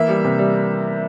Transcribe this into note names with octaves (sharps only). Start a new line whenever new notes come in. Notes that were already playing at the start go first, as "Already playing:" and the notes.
Already playing: E3 A#3 E5
G3
C3
G3